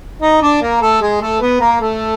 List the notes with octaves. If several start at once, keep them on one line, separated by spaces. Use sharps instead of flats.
D#4 D#5
D4 D5
A#3 A#4
A3 A4
G#3 G#4
A3 A4
B3 B4
A#3 A#4
A3 A4